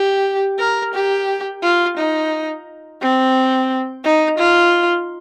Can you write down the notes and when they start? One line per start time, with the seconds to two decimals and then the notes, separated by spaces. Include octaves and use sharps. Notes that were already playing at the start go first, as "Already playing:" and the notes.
Already playing: G4
0.59 A#4
0.94 G4
1.62 F4
1.97 D#4
3.01 C4
4.04 D#4
4.38 F4